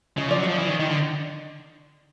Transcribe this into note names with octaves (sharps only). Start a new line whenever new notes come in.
C#3 D#5
F3 D5
F#3
F3 D#5
E3
D#3
D#3
D3